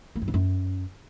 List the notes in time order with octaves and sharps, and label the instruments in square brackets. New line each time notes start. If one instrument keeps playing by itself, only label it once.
[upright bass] A#3
G2
F2
F#2